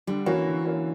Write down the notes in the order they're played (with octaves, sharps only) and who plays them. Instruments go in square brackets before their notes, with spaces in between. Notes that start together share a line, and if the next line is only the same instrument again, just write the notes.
[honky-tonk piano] D3 [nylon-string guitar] G3
[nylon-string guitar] E3 [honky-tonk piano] A#3 C#4 F#4
[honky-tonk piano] D3
A#3 C#4 F#4